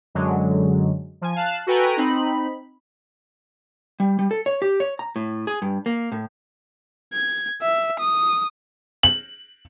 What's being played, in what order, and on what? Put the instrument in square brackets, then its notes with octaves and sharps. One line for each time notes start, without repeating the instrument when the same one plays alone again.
[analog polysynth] F#2 D3 F#3 G#3
F3 G#5
F5 A5 F#6 E7
F#4 A4 B4 G5 G#5 A#5
C4 D#4 B5
[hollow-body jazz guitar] G3
G3
A4
C#5
G4
C#5
A#5
A2
G#4
G2
A#3
A2
[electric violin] G#6
E5
D#6
[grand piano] F#7